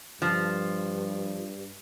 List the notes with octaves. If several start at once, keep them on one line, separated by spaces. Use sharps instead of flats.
G2 F3